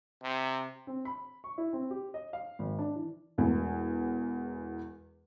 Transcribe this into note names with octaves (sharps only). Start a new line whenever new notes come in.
C3
C4
B5
C#6
E4
C4
G4
D#5
F5
G#1
D4
E3
E1 E2